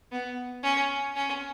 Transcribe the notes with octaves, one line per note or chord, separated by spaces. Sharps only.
B3
C#4
C#4